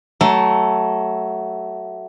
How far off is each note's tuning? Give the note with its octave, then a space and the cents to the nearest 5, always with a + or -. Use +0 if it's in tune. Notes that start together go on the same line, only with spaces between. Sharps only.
F#3 +20 A3 +0